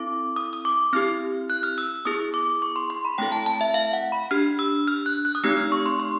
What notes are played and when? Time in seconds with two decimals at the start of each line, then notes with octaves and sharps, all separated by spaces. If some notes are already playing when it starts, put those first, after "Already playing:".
Already playing: C4 E4 A4 D6
0.36 D#6
0.53 D#6
0.65 D6
0.93 C4 E4 G4 F6
1.50 F#6
1.63 F6
1.78 E6
2.05 B3 E4 G#4 D#6
2.34 D6
2.62 C#6
2.76 C6
2.90 C6
3.05 B5
3.18 A3 C4 E4 A4 G5
3.32 A5
3.46 A5
3.61 E5
3.74 F5
3.93 F#5
4.12 B5
4.31 D4 G4 F6
4.59 E6
4.88 F6
5.06 F#6
5.25 F#6
5.35 D#6
5.44 A3 C4 D#4 G4 E6
5.57 F6
5.72 C#6
5.86 C6
6.00 C6